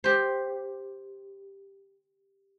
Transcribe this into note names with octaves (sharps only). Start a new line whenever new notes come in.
G4 C5